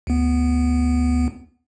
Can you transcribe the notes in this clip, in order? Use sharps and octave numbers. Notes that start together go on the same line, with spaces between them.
D2 B3